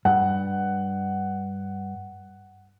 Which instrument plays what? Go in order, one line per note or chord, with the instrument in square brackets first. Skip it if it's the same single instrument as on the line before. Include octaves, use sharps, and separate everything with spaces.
[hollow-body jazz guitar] G2 [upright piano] F#5